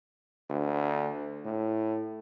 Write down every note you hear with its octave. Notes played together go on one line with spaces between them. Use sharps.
D2
A2